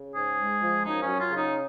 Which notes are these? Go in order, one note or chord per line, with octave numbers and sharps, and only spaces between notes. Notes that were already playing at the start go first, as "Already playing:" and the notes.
Already playing: C#3
G#2 G#4
G#3
F3
F#2 D#4
C#4
F#3
F4
C#3
D#4